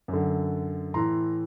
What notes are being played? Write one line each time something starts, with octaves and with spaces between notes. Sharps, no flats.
F#2
D3
A2 E3 A#5 C6